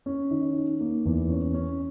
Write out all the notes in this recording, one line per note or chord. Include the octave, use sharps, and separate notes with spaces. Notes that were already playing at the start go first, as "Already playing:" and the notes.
C#4
D#3
D#3
A#3
E2
C#4
C#4